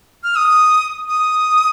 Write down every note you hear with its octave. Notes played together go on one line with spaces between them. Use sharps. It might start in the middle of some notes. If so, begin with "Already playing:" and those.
F6
D#6
D#6